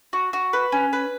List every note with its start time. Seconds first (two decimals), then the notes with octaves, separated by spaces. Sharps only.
0.13 F#4
0.33 F#4
0.53 B4
0.72 C#4
0.93 B4